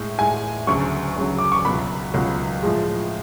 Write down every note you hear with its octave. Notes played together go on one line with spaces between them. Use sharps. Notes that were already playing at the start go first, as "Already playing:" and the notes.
Already playing: A2 G#3
A2 G#3 G#5
D2 C#3 F#3 C#6
D2 C#3 F#3
D6
C#6
C#2 B2 F#3 B5
C#2 B2 F#3
A2 F3 G#3